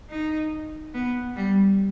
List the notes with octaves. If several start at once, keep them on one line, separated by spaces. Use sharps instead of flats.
D#4
B3
G3